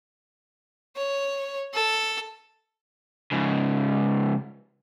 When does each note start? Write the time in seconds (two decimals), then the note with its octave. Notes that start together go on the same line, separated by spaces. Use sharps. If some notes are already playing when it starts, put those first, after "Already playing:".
0.96 C#5
1.74 A4
3.32 G#2 C#3